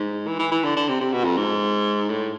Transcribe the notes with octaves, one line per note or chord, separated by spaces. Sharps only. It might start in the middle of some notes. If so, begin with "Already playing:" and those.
Already playing: G#2
E3
E3
E3
D3
D3
C3
C3
B2
F2
G#2
A2